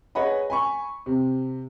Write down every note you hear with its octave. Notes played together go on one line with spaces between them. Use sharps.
G#4 B4 C#5 D#5 F#5 B5
G#5 B5 C#6
C3